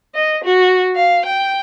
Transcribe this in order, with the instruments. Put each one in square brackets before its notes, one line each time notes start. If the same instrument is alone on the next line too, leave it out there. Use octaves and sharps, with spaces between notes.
[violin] D#5
F#4
F5
G5